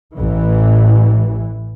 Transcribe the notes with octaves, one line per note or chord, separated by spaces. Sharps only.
A1 E3